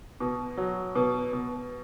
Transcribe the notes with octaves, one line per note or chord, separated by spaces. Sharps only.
B2
F#3
B2
B2